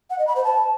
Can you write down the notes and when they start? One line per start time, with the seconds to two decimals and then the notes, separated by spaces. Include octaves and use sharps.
0.10 F#5
0.19 D#5
0.27 B5
0.36 C5
0.44 A5